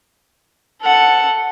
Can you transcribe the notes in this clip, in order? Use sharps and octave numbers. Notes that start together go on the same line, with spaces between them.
A4 F#5